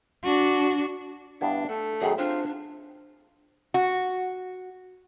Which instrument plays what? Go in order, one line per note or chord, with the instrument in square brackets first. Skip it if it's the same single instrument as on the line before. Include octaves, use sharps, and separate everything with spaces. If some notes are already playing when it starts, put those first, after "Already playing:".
[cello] D4 F#4
[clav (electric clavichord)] G2 B3 E4 [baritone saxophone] D4
[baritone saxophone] A3 [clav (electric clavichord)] F#5
[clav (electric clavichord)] F#2 D#3 [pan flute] G#4
[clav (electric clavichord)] C4 C5 [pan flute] D4 [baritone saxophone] F4
[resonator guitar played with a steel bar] F#4